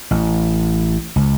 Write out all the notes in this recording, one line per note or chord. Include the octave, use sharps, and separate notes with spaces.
A1
C#2